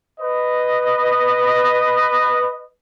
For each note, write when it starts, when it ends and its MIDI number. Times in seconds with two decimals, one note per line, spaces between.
0.20 2.65 71
0.20 2.65 75